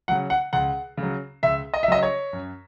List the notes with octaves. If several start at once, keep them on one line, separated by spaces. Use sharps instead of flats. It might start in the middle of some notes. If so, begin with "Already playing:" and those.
C#3 F#3 F#5
F#5
C#2 F#5
C#3
F#3
C#2 E5
D#5
E5
C#3 F#3 D#5
C#5
F#2